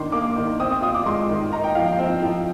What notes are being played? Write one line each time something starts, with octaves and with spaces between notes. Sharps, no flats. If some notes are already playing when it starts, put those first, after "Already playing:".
Already playing: D#3 D4 C6
A#3 D6
D#3
C4 D#6
D#6
F4 D#6
D6
G#3 C6
D#3
D#4 A#5
G5
F3 F5
G5
C4
F3